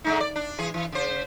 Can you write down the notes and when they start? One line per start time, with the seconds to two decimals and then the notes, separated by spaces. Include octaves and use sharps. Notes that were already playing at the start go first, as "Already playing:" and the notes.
0.04 D3 G#3 D#4
0.20 D5
0.36 D4
0.59 E3 G#4
0.74 E3
0.92 C#3 C5